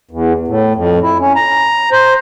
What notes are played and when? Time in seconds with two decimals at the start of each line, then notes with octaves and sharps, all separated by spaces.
0.11 E2
0.47 A2
0.76 F2
1.02 E4
1.20 C#4
1.35 A#5
1.92 C5